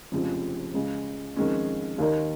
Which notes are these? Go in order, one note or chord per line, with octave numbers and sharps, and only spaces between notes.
F1 F2 C#3 F3 G#3
C#2 C#3 G#3
F2 D#3 G#3 C#4
D#2 D#3 A#3 D#4